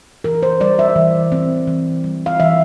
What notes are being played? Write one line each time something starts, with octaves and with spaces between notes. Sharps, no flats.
E3 A#4
C5
G3 D5
E5
E3
C4
E3
G3
F5
E3 E5